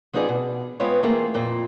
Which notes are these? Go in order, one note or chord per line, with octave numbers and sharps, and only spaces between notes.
F3 B3 C4 D#4 G#4 D5
B2
G#3 B3 C4 F4 B4 C#5
E3 A3 A#3 C4 F4 G#4
F2 A#2 C4